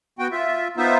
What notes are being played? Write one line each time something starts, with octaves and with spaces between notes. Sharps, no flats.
B3 F#4 G5
F4 E5
B3 D#4 F4 C5 E5